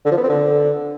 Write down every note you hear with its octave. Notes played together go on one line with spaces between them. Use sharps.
D3
F3
B3
C4
D3